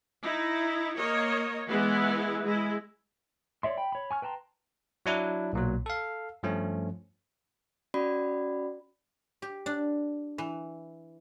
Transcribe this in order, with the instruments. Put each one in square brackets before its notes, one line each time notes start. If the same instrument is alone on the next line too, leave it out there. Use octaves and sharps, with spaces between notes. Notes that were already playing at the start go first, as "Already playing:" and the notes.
[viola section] D#4 E4
A#3 C#5 D#5
E3 G#3 B3 E4 B4
G#3 E4
[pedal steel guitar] C#5 D5 E5 C6
G5 B5
C#5 B5
G#5 C#6 F6
B4 G5 A5 A#5 C6
[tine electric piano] F#3 D4 E4
B1 A#2 F#3
A4 F5
G2 F3 A3 C#4
[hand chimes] C#4 F#4 D5 B5
[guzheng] G4
D4
E3